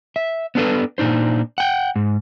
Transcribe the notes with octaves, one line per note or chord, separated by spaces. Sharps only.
E5
B3 C#4 D4 F4 A4 B4
A#2 D4 D#4 C5
F#5 G5
G#2